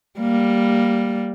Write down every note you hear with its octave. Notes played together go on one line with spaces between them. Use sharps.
G3 A#3